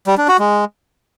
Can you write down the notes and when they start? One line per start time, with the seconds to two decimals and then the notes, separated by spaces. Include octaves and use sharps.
0.07 G3
0.18 D4
0.28 F#4
0.39 G#3